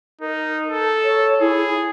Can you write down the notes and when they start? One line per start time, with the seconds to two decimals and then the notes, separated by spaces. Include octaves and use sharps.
0.21 D#4 A#4
0.68 A4
1.04 C#5
1.40 E4 G#4